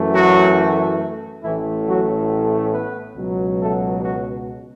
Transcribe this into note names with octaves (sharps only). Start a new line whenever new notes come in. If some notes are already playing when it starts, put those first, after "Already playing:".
Already playing: F#2 E3 A3
F#3 F#4
A1 A2 E3 A3 E4
F#3 F#4
B3 B4
C#2 B2 F#3
A3 A4
F#3 F#4